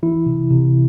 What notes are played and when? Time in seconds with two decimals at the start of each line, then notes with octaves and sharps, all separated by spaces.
0.03 E3 E4
0.26 C3
0.51 C3